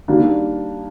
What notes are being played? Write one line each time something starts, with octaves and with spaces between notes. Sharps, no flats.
D#3 G3 A#3 D4